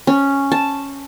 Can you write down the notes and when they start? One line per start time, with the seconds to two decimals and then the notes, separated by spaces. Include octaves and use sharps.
0.07 C#4
0.52 A5